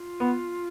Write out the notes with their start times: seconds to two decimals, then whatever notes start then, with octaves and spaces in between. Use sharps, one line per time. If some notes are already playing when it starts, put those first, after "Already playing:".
Already playing: F4
0.20 B3